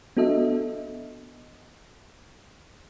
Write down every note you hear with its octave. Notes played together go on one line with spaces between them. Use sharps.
B3 D4 F#4 A4 D#5 E5